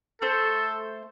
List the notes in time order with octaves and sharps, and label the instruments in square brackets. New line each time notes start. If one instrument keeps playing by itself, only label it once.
[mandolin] A3 C5 [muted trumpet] A4